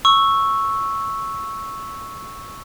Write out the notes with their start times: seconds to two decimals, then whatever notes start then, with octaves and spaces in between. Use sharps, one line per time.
0.05 C#6 E6